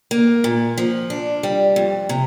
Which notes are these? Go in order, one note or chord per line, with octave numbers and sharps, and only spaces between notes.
A#3
A#2
F3
D4
G3
F2
C3